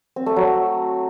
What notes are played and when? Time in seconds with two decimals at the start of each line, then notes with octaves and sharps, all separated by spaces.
0.16 C4
0.26 A3
0.36 F#3